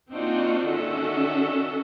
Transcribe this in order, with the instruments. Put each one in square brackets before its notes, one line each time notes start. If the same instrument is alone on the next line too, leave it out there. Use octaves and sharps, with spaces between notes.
[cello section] A#3 C4 D4 D#4 F4 F#4
D#3 C#4 D4 F#4 A4 E5